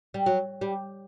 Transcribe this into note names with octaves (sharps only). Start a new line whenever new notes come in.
G3
F#3
G3